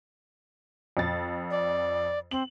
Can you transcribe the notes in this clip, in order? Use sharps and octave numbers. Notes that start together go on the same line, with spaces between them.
F2 A6
D5
C4 F#7